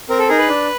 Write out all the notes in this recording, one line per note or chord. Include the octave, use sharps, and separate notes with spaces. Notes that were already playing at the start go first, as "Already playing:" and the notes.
C4 A#4
A4
D#4 G#4 A#4
B4
D4